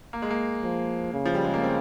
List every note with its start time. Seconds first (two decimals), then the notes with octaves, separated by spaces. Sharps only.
0.13 A#3
0.22 G#3
0.30 A#3
0.63 F3
1.13 C#3
1.25 F3
1.35 G3
1.44 G#3
1.54 A#3
1.63 C4